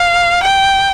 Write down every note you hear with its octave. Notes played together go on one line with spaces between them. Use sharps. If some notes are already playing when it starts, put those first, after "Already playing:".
Already playing: F5
G5